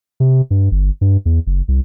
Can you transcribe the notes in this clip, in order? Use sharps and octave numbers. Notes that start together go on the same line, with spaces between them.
C3
G2
G1
G2
E2
F#1
C2